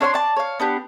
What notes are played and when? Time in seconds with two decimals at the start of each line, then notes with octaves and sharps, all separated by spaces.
0.01 D4 C#5 F5 C6
0.14 D5 A5
0.36 C#5 F5
0.60 B3 D4 G4